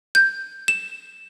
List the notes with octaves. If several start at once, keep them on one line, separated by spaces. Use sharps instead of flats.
G6
E7